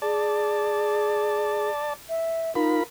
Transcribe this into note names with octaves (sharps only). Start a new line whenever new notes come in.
G#4 D5 A5
E5
D#4 F4 A#4 B5